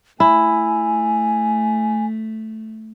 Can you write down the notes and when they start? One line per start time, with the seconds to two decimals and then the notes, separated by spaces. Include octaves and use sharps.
0.20 A3 E4 G#5